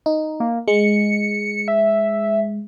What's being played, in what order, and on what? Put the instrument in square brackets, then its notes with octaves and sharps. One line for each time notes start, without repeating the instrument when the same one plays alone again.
[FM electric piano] D#4
[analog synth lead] A#3
[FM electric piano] G#3 [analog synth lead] C#7
[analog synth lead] E5